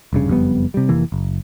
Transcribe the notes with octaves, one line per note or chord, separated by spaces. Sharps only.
F1 G2 C#3
F#1 F2 G3 B3
C3 G3
F1 C3 E3 A#3
F#1